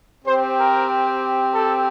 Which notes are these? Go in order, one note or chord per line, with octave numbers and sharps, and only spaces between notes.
C4 G4 C5
A#4
A4